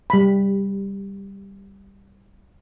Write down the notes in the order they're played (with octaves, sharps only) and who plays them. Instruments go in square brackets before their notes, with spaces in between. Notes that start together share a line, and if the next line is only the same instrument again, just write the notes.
[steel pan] G3 B5